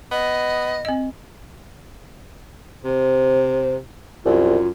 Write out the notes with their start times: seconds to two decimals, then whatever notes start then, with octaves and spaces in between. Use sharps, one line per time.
0.11 B3 D#5
0.85 C4 D#5
2.85 C3 C5
4.25 C2 F#2 F4